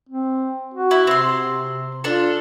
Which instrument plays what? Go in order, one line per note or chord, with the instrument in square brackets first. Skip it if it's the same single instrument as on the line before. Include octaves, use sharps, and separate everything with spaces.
[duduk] C4
F#4
[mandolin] E4
[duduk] C3 [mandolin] C4 C6
[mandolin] D4 A4 [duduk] F4